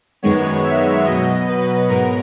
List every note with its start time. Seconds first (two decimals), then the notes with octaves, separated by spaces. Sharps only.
0.22 F#2 D#3 G#3 B3 C#5
0.64 E5
1.05 B2 F#3 B3 D#5
1.48 B4
1.89 G#2 F#3 B3 A#4